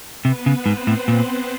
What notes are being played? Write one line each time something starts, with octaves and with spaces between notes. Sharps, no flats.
C3 B3 B4
C#3
G#2 C4 C5
A2
A#2